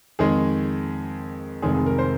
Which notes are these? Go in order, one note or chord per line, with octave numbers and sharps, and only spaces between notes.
F2 D#3 G#3 G#4
F1 F2 D#3 G#3 G#4
G#4
A#4
C5